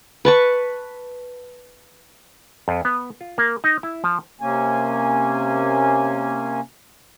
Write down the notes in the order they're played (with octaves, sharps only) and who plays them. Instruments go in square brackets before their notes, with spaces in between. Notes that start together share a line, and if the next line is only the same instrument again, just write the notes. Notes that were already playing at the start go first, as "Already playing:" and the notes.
[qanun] B4 A5 C#6
[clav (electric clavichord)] F2
B3
F4
A#3
D#4
E4
F3
[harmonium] C3 A#3 C#4 G#5